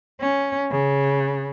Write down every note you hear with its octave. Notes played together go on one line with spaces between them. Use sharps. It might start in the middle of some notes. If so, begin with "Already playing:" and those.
C#4
C#3